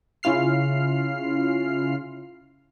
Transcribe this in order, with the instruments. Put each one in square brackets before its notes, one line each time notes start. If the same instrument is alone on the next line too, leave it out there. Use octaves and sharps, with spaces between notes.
[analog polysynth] C#3 C#4 E4 F4 F6 C7